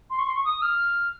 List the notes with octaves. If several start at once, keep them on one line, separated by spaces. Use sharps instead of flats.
C6
C#6
C6
C#6
D#6
F6